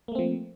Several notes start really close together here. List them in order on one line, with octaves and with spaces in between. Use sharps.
A#3 A3 C4 F3